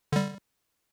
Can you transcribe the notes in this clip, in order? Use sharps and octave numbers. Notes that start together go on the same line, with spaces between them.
D3 G3